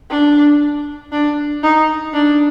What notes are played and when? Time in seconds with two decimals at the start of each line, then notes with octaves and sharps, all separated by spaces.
0.10 D4
1.12 D4
1.63 D#4
2.14 D4